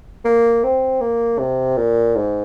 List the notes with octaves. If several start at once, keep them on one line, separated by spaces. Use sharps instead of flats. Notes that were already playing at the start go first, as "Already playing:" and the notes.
A#3
C4
A#3
C3
A#2
G#2